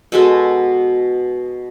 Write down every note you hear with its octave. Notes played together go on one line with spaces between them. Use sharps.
B2 G#3 B3 A4